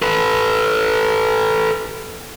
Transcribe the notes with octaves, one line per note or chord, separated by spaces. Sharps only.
A4 B4